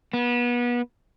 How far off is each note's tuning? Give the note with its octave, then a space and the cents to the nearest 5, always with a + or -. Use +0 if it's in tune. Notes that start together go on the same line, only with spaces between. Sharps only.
B3 -30